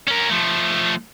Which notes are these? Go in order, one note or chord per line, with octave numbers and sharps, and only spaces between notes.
C#4 A#4
F3 A3